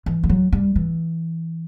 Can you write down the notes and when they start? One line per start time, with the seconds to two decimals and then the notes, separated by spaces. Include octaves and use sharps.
0.06 E3
0.24 G3
0.29 F#3
0.52 G3
0.76 E3